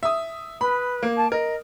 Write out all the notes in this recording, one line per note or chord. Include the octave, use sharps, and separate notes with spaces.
E5 D#6
B4 B5
A#3
A5
A#4 D#5